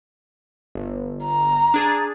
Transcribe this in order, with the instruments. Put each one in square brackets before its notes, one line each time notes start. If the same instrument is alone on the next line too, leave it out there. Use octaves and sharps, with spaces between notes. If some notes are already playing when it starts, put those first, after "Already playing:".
[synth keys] G1
[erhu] A#5
[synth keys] D4 G#4 A6